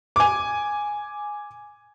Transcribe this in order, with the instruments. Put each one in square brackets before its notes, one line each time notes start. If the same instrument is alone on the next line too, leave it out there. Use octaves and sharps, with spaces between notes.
[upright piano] G#5 D6